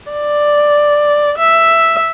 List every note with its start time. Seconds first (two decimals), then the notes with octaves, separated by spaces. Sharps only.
0.11 D5
1.38 E5